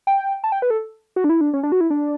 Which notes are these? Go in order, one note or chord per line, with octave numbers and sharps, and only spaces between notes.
G5
A5
G5
B4
A4
F#4
D4
E4
D4
C#4
D4
F#4
E4
D4